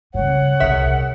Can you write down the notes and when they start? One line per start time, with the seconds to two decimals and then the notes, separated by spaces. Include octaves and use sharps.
0.14 G2 C#3 C#5 F#5
0.60 D#1 C2 G#4 A#4 E5